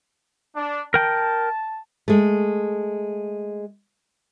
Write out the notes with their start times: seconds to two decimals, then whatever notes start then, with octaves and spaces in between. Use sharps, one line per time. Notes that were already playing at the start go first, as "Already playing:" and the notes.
0.56 D4
0.94 A#4 G5 A5
2.08 G#3 A3